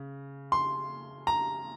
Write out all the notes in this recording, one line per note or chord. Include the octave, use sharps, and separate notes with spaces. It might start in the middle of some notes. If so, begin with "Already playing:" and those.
Already playing: C#3
C6
A#5